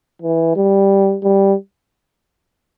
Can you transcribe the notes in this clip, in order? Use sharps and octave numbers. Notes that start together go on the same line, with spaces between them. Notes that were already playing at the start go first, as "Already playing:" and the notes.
E3
G3
G3